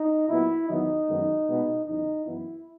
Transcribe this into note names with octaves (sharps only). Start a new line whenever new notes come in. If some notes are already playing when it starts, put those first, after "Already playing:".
Already playing: D#4
A#2 F#3 B3 E4
E2 D#3 F#3 B3 D#4
F#2 D#3 G#3 B3
B2 G#3 B3
E2 C#3 F#3 D#4
F#2 E3 B3 E4